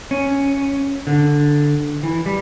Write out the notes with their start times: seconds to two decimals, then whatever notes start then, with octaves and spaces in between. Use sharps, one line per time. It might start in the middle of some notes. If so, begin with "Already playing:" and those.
0.11 C#4
1.07 D3
2.03 E3
2.26 G3